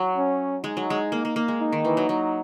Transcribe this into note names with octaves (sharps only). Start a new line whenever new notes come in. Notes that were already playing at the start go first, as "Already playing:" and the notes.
Already playing: F#3
C#4
G#3 D#4
F#3
G#3
A#3
A#3
A#3
G#3
D#4
D#3
E3
F#3
F#3